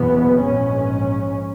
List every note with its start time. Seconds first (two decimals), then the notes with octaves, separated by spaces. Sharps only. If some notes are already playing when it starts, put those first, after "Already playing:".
Already playing: F#1 E2 B2 B3
0.42 A#1 G#2 C#4